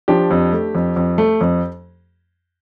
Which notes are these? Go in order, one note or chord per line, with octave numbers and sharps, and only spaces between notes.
F3 D4 G4
F2
A3
F2
F2
A3
F2